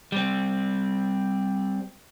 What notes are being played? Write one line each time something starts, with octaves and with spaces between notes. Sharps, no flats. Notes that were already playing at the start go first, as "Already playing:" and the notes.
G3 C4